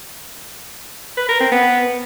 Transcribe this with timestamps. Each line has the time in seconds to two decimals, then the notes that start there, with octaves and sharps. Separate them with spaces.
1.17 B4
1.29 A#4
1.40 C4
1.52 B3